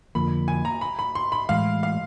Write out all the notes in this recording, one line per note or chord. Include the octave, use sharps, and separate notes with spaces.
F2 D3 F3 A#3 B5
G#5
A#5
B5
B5
C6
B5
A2 E3 G#3 F5
F5